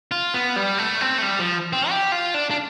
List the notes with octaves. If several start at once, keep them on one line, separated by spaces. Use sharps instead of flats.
F4
B3
G3
A3
C4
A3
G3
F3
C4
G4
F4
D4
D4